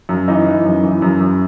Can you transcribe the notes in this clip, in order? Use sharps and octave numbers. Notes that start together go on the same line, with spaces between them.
F#2
E3 D#4
E3
F#2
E3
F#2
F#2